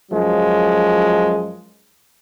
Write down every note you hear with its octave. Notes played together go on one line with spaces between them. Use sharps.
F#2 F3 F#3 G#3